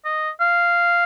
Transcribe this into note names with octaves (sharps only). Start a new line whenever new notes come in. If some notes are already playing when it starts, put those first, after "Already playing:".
D#5
F5